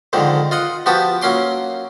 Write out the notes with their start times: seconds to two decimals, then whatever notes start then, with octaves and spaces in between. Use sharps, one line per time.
0.13 F2 G#2 D3 D#3
0.51 F4 D#5 F#5
0.86 F3 B3 F#4 G4 A5
1.22 F#3 A#3 C#4 C6 D6